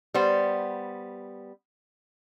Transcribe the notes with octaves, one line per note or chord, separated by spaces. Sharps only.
G3 B3 C5